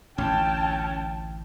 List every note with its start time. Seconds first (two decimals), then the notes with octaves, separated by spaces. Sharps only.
0.18 A1 D2 C#4 G5 A5